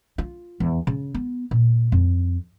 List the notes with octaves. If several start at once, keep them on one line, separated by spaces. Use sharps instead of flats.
F4
E2
C#3
B3
A#2
F2